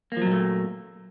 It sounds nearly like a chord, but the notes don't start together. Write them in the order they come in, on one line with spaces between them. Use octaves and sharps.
A#3 F3 F#3 A#2 A3